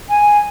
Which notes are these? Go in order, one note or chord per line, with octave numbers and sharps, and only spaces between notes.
G#5